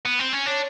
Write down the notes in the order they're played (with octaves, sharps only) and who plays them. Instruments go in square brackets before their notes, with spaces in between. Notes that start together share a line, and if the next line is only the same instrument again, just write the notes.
[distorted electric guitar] B3
C4
C#4
[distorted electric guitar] D4 [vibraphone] C#5